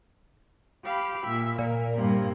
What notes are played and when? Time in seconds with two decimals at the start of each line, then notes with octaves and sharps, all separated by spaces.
0.84 G4 F5 B5
1.24 A#2 E5
1.59 A#2 A#4
1.95 G2 C3 A#3